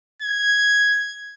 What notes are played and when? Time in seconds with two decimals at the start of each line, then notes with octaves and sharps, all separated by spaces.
0.22 G#6